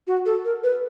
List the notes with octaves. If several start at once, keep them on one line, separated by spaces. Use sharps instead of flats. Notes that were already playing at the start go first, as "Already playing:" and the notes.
F#4
A4
A#4
B4